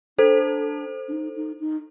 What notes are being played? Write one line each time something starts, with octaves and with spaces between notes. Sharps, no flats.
D4 A4 C5
D4
D#4
D#4
D#4